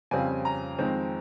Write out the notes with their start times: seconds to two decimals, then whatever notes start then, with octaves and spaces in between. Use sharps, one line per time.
0.11 F2 C#3 G3 C4 F4 G#5
0.45 A#5
0.79 F2 D#3 G#3 C4 D#4